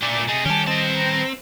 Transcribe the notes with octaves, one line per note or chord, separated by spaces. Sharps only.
A#2 A3 D4 D5
C3 A3 G#4 D#5
D#3 G3 C#4 G4 A4 G#5
C4 B4 D#5 A5
A#5